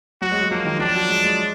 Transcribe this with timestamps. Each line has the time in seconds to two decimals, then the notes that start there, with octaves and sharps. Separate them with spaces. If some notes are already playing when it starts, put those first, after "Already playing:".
0.22 F#3 F#4
0.31 G#3
0.41 F#3
0.51 F3 A#3
0.65 D#3
0.79 F3 D4
0.95 F#3
1.09 G#3
1.24 G#3